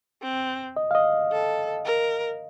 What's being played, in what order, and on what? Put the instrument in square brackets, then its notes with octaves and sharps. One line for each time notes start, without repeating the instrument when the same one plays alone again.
[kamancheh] C4
[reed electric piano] D#5
F5
D#5
[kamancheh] A4
A#4